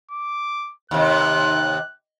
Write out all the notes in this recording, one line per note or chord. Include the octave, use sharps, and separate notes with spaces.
D6
D#2 C3 F#6